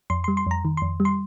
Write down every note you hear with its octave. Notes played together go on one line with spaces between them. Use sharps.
F2 C6
G3 C6
C6
F2 A#5
D#3
F2 C6
G3
C6